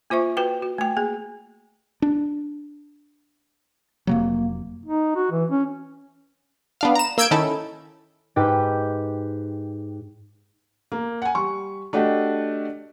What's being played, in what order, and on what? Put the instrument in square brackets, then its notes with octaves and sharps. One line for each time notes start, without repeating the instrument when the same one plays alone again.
[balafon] A#3 F4 C5 E5 C#6
F#4 B4 G5
F#4
A3 G5
A#3 G#4
[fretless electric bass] D4
[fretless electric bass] F1 C3 F#3 [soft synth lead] A#3
[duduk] D#4
F#4
E3
C#4
[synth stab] B3 D4 F5
A#5 E7
A#3 E6 G6 G#6 D7
D#3 C#4 D#4 E4 A4
[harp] G#2 G4 B4 G5
[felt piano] A#3
F#5 G#5
G3 C#6
A3 D4 F#4 G4 D#5